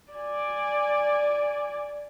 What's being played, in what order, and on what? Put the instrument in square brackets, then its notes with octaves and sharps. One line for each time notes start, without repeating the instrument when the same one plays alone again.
[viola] D5 G#5